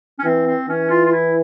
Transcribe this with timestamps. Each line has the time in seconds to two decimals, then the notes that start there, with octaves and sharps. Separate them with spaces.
0.19 C#4
0.24 E3 C4
0.46 C4
0.68 E3 C#4
0.90 F4
1.05 F4
1.11 E4